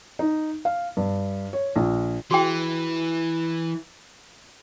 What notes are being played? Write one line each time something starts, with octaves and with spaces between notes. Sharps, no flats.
D#4
F5
G2
C#5
A#1
E3 F#4 G#4 G5